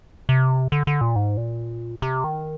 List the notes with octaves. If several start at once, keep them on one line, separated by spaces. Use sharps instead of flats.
C3
D3
D3
A#2
G#2
A#2
C3
D#3